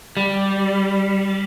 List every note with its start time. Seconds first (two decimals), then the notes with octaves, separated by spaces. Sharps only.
0.17 G3